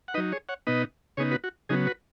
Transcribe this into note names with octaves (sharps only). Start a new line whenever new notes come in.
F#5
F#3 D#4 B4 D#5
G#4 C#5
C#5 F#5
B2 B3 D#4 B4 D#5
C#3 B3 D#4 G#4 C#5
F#4 B4
F#4
C#3 F#3 B3 D#4 G#4
F#4 B4